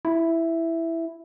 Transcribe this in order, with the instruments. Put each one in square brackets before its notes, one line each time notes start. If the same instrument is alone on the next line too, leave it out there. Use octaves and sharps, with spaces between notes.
[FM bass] E4